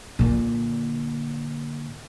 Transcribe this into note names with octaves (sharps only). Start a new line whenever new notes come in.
A#2 D3